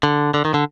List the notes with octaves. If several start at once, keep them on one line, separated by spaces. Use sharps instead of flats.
D3
D3
D#3
D3